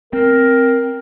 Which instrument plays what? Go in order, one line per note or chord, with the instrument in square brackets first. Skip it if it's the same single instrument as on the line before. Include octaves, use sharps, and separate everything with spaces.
[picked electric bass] C4 [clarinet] A#4